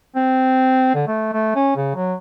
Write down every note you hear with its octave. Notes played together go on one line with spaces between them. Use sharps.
C4
D3
A3
A3
C#4
C#3
F#3